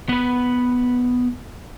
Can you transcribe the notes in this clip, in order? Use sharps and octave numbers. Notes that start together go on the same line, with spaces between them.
B3 B4